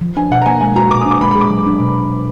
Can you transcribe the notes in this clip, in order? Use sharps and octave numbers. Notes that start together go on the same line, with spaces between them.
F3
D4 G#5
B2 F#5
A#5
A#3 G#5
G#3 G#5
F#4 A#5
A#2 D6
D#6
D4
D6
G#3 B5
B5
G#4
D6
F#3
D4
B2